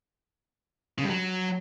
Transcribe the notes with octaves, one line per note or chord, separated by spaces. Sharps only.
C#3
G2
F#3